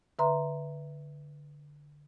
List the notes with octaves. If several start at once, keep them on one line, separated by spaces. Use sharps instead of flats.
D3 B4 E5 A#5 C6